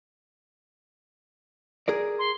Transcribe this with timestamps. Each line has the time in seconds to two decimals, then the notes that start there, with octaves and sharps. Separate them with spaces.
1.88 G#4 A#4 D5
2.19 C6